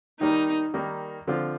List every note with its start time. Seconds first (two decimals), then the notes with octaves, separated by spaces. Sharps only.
0.20 D#3 G3 A#3 D#4
0.74 D#3 G3 A#3
1.27 D3 F3 C4 F4